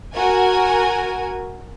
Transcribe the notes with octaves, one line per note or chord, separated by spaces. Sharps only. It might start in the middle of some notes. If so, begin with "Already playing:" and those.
F#4 A#4 G#5